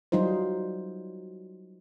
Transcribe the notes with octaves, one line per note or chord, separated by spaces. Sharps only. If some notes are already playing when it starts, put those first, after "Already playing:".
F#3 G3 D#4 F4 C5